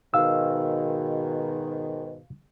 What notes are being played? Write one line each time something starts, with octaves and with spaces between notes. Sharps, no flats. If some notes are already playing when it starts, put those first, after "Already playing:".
G#2 B2 D#3 F5 E6